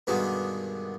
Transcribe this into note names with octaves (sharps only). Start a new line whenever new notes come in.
G2 B2 D3 D#3 G#3